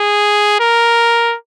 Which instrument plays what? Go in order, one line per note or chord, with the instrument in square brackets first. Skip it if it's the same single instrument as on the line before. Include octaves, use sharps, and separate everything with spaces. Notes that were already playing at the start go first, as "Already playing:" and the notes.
Already playing: [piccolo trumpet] G#4
A#4